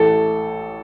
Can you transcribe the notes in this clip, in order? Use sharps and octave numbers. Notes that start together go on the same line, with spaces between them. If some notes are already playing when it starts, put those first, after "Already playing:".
Already playing: A1 A2 A3 A4